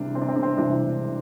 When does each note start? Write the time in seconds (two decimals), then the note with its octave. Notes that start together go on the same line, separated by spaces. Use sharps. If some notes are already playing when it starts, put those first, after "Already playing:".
Already playing: C2 C3 E3 G#3 D4
0.15 C4
0.21 D4
0.29 C4
0.36 D4
0.43 C4
0.57 C2 C3 E3 G#3 D4